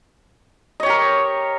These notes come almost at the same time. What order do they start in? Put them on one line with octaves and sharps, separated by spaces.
D#5 C#5 G4 A#4